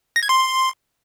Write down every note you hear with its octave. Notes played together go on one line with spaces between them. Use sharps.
A#6
G#6
C6